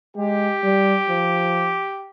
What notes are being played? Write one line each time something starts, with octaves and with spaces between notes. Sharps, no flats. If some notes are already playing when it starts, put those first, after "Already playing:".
G#3 G4
G3
F3